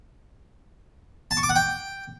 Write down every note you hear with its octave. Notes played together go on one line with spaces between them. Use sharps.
A5
C#6
D6
F#5
G5